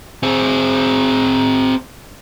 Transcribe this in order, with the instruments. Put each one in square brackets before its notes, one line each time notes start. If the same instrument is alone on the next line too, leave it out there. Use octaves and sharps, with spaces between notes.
[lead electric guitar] C4 G#4